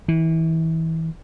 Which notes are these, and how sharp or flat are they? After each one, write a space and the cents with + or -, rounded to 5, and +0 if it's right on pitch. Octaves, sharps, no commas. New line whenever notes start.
E3 -30